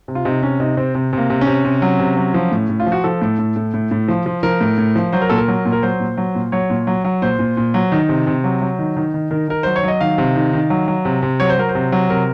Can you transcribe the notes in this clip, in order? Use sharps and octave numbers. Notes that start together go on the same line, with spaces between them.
C3
F4
C3 D#4
C3 C#4
C3 D#4
C3 C4
C3
C3 A#3
C3
C#4
C3
C3
F#3
C3
F#3
F3
A2
A2
F4
F3
F#4
F3 A4
A2
A2
A2
A2
A2
F3
F3
F3 A#4
A2
A2
F3
F#3 C5
A#4
A#2 A4
A#4
F#3
A#2
A#4
F#3 C5
A#2
F#3
A#2
F#3 C#5
A#2
F#3
F#3
A#2 C5
A#2
A#2
F#3
D#3
C3
C3
F#3
F#3
D#3
D#3
D#3
D#3 A#4
D#3 A#4
F#3 C5
C#5
F#3 D#5
D#3 F5
C3
D#3
D#3
F#3
F#3
C3
C3
F#3 C#5
C5
F#3 A#4
C5
C3
F#3
C3 A#4